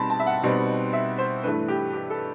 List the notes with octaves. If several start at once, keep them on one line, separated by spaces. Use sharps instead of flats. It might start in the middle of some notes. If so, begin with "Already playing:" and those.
Already playing: B2 G3 C4 D#4 A5 B5
A5
E5
F#5
B2 G3 C4 D#4
E5
C5
G2 E3 A3 B4
G4
G4
A4